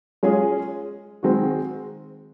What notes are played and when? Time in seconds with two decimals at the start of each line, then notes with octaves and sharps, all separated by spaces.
0.23 G#3 C#4 F4 G#4
1.23 D#3 G#3 C4 F#4